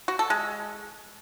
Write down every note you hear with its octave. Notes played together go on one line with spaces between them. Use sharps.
F#4
A4
G#3